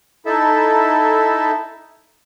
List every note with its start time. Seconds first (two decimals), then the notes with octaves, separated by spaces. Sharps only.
0.26 D#4 E4 A4 E5